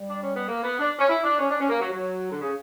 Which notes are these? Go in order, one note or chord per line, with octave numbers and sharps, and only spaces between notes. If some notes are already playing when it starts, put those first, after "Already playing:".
Already playing: G3
D4
C#4
B3
A#3
B3
D4
C#4
E4
D4
C#4
D4
C#4
A#3
F#3
F#3
D3
C#3